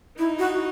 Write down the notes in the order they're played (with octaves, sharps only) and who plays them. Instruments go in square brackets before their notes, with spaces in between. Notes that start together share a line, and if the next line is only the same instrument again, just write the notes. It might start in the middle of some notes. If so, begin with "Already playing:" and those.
[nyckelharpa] D#4 [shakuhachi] E4
[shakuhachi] F#4